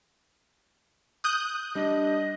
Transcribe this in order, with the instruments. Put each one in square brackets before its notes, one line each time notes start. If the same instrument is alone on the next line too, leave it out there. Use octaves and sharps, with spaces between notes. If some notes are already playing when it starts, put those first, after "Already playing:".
[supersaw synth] D#6 F#6 G6
[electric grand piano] G3 D4 [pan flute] D#5